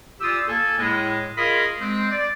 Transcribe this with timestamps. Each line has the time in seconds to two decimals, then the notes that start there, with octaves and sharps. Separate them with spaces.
0.21 A#2 F4 G4 D#6 E6
0.48 A#3 A4 G#5
0.78 A2 G#3
1.37 F4 G#4 A#4 D#5 F5 B5
1.80 G#3 C4
2.11 D5